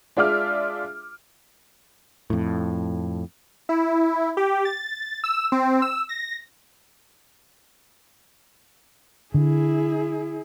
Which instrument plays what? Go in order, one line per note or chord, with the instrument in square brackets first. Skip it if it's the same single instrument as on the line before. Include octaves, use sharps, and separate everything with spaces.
[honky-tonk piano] G#3 D4 F4 E5 D6 F6
[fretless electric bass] F2 A2
[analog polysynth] E4
G4
A6
E6
C4
E6
A#6
[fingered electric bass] D3 [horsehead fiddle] E4 G#4